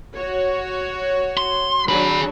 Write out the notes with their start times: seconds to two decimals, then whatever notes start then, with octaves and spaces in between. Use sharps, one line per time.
0.15 F#4 C#5
1.37 C6
1.89 F#3 D4 G#4 B5